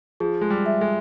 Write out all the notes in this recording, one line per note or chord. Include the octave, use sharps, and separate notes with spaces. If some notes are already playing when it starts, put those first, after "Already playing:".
F3 G#4
G#3
G3
E5
G#3